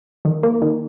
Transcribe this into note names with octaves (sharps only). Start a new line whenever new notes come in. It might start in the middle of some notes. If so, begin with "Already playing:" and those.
D#3
A#3
D#3